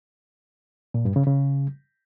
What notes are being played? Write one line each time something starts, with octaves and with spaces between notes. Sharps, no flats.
A#2
G2
C#3
C#3